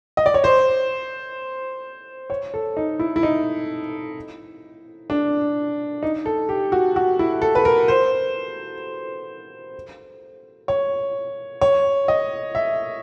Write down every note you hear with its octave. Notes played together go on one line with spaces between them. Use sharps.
D#5
D5
C#5
C5
C#5
A4
D#4
E4
E4
D#4
D4
D#4
A4
G4
F#4
F#4
E4
A4
B4
A#4
C5
C#5
C#5
D#5
E5